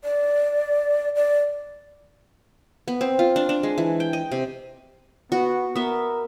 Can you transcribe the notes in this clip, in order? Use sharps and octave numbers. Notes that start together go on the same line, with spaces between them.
D5
D5
B3
C4
F4
D4
D4
G#3
E3
G5
D#5
C3
B3 F#4
B3 A#4 E5